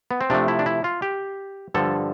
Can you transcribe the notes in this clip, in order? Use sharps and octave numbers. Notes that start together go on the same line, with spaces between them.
B3
C4
C3 F3 A3 D4
E4
D4
E4
F4
G4
G2 D3 F3 A4